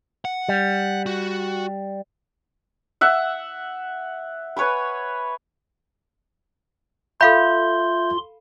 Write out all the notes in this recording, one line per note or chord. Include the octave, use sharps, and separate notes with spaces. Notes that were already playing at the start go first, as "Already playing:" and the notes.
F#5
G3
F#4
E5 F#5 E6
B4 C#5 G#5 B5
F4 A4 E5 F5 B5 C6 G6